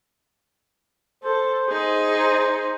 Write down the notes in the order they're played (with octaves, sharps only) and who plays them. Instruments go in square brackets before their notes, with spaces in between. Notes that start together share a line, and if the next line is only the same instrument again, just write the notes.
[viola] A4 [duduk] C5
[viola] D#4 G#4 [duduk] C5
[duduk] C5